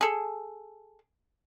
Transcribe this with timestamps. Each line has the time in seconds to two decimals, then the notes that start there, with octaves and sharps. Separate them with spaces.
0.01 G#4 A4